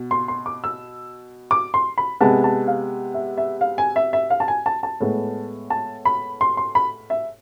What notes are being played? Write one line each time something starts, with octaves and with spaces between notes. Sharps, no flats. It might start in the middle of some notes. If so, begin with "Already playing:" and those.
Already playing: B2
C6
C6
D6
E6
D6
C6
B5
C3 G#3 B3 A5
A5
F5
E5
E5
F5
G#5
E5
E5
F5
A5
G#5
A5
A5
A2 G#3 B3
A5
B5
C6
C6
B5
E5